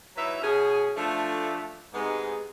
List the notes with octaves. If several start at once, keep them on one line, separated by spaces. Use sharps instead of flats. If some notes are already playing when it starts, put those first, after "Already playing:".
F#3 D#4 E4 B4 E5
B2 C#4 G#4
F3 A3 D4
G#2 C3 G#3 B3 D#4 G#4